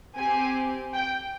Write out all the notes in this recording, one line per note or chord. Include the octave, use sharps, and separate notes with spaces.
C4 G4 G#5
G5